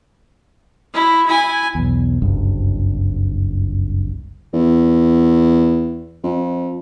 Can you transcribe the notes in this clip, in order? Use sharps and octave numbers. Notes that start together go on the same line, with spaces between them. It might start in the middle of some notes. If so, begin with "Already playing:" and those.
E4
E4 G#5
B1 E2
F#1 C2 G2
E2
F2